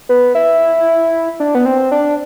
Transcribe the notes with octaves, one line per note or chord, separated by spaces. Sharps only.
B3
E4
D4
B3
C4
D4